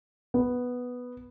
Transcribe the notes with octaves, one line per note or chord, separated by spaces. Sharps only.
B3